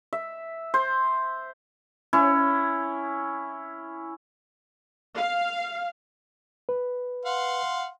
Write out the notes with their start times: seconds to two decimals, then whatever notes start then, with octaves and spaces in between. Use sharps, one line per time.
0.13 E5
0.74 C5
2.13 C#4 E4
5.16 F5
6.69 B4
7.25 F5 F#5 C6